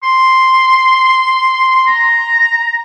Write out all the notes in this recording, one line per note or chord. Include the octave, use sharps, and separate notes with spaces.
C6
A#5